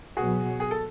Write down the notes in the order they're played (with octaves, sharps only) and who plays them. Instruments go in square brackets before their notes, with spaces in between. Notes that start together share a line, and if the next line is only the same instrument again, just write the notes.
[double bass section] B2 F#3 B3 [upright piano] F#4 G#4
[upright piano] G#4
A4